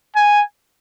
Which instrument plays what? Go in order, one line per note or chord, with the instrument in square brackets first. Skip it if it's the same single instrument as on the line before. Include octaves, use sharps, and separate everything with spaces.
[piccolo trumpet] G#5